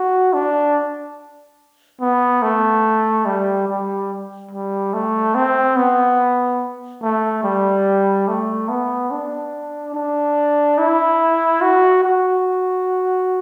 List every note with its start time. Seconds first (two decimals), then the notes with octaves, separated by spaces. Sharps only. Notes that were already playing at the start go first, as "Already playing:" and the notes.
Already playing: F#4
0.33 D4
2.01 B3
2.42 A3
3.26 G3
3.68 G3
4.51 G3
4.94 A3
5.35 C4
5.77 B3
7.02 A3
7.44 G3
8.28 A3
8.69 B3
9.11 D4
9.94 D4
10.78 E4
11.62 F#4
12.04 F#4